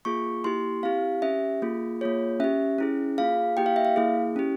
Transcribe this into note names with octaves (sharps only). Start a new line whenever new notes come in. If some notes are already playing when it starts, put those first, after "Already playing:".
A#3 F4 G#4 C#6
A#3 E4 G4 C6
C4 E4 G4 F5
C#4 G4 E5
A#3 F4 G#4
A#3 F4 G#4 C#5
C#4 G4 E5
C#4 E4 G#4
A#3 F4 G#4 F5
A#3 E4 G4 G5
F5
E5
F5
A#3 E4 G#4
C#4 E4 G4